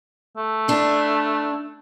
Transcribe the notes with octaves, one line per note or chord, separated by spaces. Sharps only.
A3
D4 E4